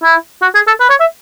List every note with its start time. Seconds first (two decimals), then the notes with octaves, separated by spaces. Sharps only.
0.03 E4
0.42 F#4
0.55 G#4
0.67 A4
0.80 B4
0.90 C#5
1.00 E5